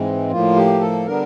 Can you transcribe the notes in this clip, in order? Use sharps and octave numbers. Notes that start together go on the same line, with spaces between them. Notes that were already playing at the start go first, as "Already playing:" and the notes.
Already playing: G#2 E3 G#3 C4
A2 F3 A#3 F4
G4
A4
D3 G3 B3 D4 A#4